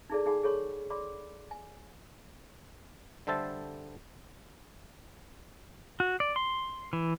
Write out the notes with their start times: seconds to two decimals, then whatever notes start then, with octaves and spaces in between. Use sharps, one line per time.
0.10 D#4 E4 G#4 A4 D5
0.26 D#4 G#4 F#5 G#5 B5
0.43 G#4 A4 C#5 B5 C#6
0.90 D5 B5 C6 D6
1.51 G#5
3.27 D3 G3 A4 C5 E5 A5
6.00 F#4
6.20 D5
6.36 C6
6.93 E3